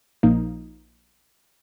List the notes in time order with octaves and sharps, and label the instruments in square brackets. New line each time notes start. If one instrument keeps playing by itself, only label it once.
[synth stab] A#1 A#2 F3 A#3 D#4